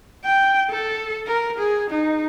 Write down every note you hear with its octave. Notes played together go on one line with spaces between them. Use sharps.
G5
A4
A#4
G#4
D#4